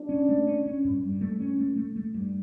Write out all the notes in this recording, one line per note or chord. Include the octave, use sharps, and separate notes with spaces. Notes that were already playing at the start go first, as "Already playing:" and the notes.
Already playing: D4
C#4
A3
C#4
C#4
G2
G2
A3
C#4
A3
A3
A3
G2